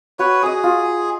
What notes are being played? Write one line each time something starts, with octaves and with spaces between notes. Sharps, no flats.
F#4 B4 C#5
G#4 D#5 D#6
F4